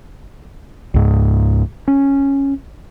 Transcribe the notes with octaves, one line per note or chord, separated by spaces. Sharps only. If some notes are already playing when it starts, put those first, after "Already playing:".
C#2 G#2
C#4